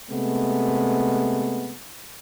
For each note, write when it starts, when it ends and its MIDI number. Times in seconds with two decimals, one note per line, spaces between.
0.11 1.76 48
0.11 1.76 56
0.11 1.76 57
0.11 1.76 59